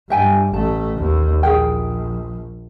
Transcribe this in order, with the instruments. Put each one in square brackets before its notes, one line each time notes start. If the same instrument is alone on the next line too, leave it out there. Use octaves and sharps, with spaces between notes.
[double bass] G2 [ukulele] E5 G5 G#5
[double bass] A1 A3 [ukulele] A5
[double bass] D#2
[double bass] A#1 [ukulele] G#4 A#4 G5